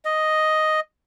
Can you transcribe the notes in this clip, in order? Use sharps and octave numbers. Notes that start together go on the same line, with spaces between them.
D#5